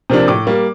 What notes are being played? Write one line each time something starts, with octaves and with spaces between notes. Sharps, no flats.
C3 F3 A#3 D4
A2 D6
G3 A#3